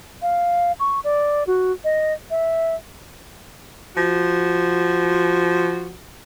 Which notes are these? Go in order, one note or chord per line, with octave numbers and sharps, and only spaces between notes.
F5
C#6
D5
F#4
D#5
E5
F3 F#4